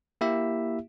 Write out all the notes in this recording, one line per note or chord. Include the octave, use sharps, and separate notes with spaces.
A#3 E4 G4 E5